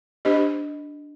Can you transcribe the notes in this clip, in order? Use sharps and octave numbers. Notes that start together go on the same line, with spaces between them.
D4 G4 C5 D#5